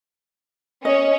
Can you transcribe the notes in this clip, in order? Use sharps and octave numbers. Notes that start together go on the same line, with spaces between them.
C#4 D#5